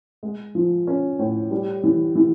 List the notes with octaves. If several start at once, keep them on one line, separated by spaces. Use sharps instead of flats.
G#3
F3
C#4
A2
G3
E3
E3